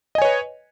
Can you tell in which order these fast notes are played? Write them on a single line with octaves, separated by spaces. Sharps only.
D#5 G#5 C#5 B4